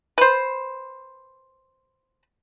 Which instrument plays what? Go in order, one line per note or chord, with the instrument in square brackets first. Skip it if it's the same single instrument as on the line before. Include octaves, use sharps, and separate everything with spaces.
[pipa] B4 C5